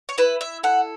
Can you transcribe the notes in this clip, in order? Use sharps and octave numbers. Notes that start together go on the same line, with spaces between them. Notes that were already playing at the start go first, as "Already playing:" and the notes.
C#5
E4 B4
E5
A4 F#5